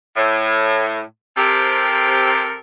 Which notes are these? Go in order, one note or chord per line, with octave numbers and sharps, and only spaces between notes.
A2
C3 C4 G4 A4 A#4